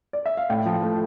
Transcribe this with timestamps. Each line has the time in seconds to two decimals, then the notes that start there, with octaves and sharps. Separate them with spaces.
0.13 D5
0.26 E5
0.37 F5
0.50 A2 G5
0.66 F3
0.83 A3